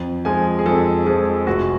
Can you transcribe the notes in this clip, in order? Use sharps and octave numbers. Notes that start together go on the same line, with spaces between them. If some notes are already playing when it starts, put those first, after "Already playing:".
Already playing: F2
F3 G#3 G#5
G#4
F2 A4
F3 G#3 G#4
F1 F#4